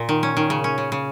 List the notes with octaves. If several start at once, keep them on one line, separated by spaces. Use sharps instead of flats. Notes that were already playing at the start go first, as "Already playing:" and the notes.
Already playing: A#2
D#3
C#4
D#3
C#3
C#4
C#3
C#3